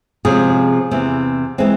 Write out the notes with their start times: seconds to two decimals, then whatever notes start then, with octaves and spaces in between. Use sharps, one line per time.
0.25 C3 F3 G#3 C#4 G#4
0.91 E2 C3 E3
1.58 E3 G#3 C4